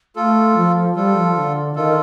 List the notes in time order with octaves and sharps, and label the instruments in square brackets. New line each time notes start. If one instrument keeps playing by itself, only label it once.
[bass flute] A3 [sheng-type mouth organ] F4 A4
[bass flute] F3
[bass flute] G3 [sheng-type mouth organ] F4 A4
[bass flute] F3
D3
[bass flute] D#3 [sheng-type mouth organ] F4 A4